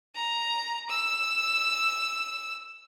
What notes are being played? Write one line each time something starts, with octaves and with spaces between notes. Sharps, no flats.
A#5
E6